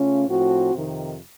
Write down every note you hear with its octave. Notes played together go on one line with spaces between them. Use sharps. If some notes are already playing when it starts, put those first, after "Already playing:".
Already playing: C#3 A3 C#4 F4
A2 F3 C4 F#4
F2 C3 D#3